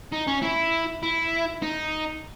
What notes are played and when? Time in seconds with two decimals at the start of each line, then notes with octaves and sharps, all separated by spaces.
0.13 D#4
0.28 C#4
0.42 E4
1.03 E4
1.62 D#4